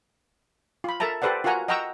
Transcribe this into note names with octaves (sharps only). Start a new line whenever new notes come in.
F4 B5
A4 A#4 E5 A5 A#5
G4 A4 B4 C5 D5 F#5
F4 F#4 A#4 F#5 G#5 A#5
D#5 F#5 G5 A#5 C#6 E6